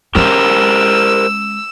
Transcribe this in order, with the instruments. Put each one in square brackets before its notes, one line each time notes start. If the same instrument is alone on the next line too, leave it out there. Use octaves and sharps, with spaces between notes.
[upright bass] G#3 C#4 [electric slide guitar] G4 A#4 C5 [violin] E6